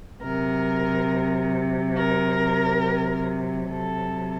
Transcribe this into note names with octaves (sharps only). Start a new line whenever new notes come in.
C3 F#3 A#4
A#4
C3 F#3 A4